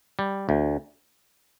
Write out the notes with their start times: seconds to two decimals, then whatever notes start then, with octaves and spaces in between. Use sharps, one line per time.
0.19 G3
0.49 D2